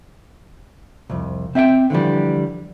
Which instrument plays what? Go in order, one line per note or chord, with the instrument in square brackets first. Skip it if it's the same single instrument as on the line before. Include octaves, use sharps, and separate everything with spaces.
[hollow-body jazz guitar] C2 F2
C4 E5 F5 G5
D3 E3 F3 G3